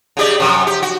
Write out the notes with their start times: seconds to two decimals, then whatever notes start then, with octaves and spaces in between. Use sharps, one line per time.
0.17 C#3 G4 D5
0.40 F#2 C3
0.67 G4
0.82 F#4